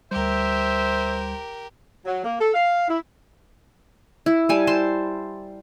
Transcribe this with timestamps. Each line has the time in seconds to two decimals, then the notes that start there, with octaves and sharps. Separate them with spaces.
0.11 D2 G3 G4 A#4 C5 E5
2.05 F#3
2.24 A#3
2.40 A4
2.54 F5
2.88 E4
4.26 E4
4.49 G3 G#5 A5
4.67 C5 A5 C6